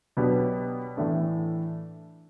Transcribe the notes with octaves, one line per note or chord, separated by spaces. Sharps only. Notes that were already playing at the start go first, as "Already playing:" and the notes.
B2 F#3 B3 D4 G4
A2 E3 A3 D4